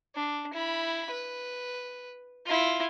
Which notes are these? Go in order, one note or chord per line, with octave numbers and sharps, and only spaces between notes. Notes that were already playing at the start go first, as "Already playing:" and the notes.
D4
E4 B5
B4
E4 F4